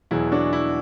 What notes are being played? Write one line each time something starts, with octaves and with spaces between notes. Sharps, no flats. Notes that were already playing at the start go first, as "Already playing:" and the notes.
E2 B2 F#3 E4 G#4
D4 F#4
E4